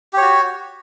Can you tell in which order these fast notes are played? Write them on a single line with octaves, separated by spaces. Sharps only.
G4 C#5 F#4